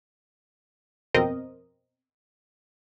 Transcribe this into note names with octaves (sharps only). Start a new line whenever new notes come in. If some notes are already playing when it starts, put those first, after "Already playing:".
G1 F2 B2 C4 A#4 D#5